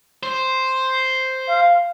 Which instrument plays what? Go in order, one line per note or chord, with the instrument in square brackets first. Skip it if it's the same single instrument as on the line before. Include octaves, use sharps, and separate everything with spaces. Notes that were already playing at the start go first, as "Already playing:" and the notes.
[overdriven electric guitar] C5
[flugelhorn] F5